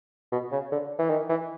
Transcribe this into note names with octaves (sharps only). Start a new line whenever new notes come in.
B2
C#3
D3
E3
D#3
E3